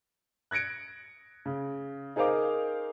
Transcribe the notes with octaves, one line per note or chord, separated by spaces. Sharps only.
F#6 G#6 A#6 C#7 D7
C#3
D#4 G#4 A#4 C5 F5 D6